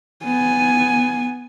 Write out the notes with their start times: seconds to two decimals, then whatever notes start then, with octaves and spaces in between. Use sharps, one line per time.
0.24 B3 G#5